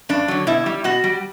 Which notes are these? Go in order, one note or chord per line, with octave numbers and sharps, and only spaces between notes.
G2 D4
D3 F#3
B2 E4
G3
B2 F#4
G3